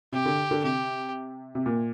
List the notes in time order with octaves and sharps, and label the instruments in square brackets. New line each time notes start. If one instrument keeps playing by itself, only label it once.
[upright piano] C3 [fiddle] G4
[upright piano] D3
D3
[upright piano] C3 [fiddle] G4
[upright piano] C3
A#2